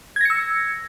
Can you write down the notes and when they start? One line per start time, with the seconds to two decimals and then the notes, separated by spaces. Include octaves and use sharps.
0.16 G#6
0.21 A#6
0.25 C#7
0.30 E6